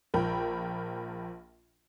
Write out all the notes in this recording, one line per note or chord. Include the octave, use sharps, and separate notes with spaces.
A#1 F3 A#4 G5 B5